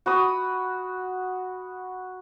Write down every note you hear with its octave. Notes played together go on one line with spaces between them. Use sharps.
F#4 B5 D#6